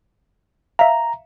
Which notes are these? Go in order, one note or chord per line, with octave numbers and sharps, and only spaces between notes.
E5 F5 A#5